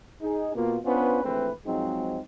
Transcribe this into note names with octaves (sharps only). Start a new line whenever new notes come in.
D#4 G#4
B2 A#3 F4
B3 C#4 D4 F4 B4 C5
A#1 E3 A3 C4 B4
G#2 F3 F#3 G#3 C4 D#4